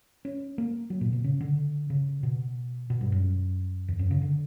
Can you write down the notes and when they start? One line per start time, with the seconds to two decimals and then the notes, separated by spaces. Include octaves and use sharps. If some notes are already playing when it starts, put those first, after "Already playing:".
0.25 C#4
0.58 A#3
0.90 F#3
1.01 A#2
1.13 B2
1.24 C#3
1.41 D3
1.90 C#3
2.23 B2
2.90 B2
3.01 G2
3.12 F#2
3.88 E2
3.99 F#2
4.11 C#3
4.22 D3